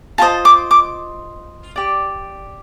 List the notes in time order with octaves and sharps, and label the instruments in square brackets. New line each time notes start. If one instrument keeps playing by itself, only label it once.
[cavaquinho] F4 A4 C5 D#5 A5
D6
D6
G4 D5